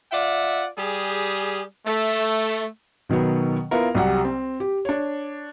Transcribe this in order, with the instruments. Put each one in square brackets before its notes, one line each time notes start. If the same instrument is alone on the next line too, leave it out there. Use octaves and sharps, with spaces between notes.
[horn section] F4 D5 E5 F#5
G3 G4 G#4
A3
[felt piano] B2 D#3 F#3 B3
B3 E4 F4 A#4
C2 F#3 G4 F#5
C4
G4
D4 C#5